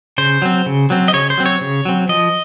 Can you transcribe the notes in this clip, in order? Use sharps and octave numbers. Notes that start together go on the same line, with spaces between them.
C#3 C5
F#3 C4
C#3
F#3 C4
D#5
C#3 C#5
C5
F#3 C4
C#5
C#3
F#3 C4
F3 D#5